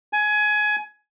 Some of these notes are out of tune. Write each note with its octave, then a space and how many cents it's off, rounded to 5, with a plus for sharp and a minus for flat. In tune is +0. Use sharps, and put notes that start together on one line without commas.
G#5 +20